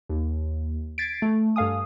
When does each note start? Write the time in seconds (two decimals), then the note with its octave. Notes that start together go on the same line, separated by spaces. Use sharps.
0.09 D#2
0.98 G#6 A6 B6 C7 D7
1.22 A3
1.56 G2 A4 F5 G#5 D#6